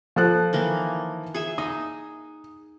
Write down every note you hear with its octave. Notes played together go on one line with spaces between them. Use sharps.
F3 A4 F#6
D#3 E3 A#3
G#4 E5
D#4 D#6